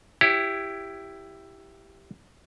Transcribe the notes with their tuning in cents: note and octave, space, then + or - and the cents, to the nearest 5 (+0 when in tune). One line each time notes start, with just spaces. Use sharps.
E4 +10 G4 +0 C#5 +0